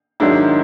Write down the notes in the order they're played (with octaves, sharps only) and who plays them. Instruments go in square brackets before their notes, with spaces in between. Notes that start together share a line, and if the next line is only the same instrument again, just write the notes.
[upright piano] G#2 D#3 F#3 D4 E4